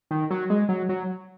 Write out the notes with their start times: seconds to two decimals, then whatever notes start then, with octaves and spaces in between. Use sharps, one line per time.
0.11 D#3
0.31 F#3
0.50 G#3
0.69 F#3
0.89 F#3